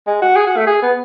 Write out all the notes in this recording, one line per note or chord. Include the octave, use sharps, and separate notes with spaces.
G#3
F#4
G#4
F#4
A3
G#4
B3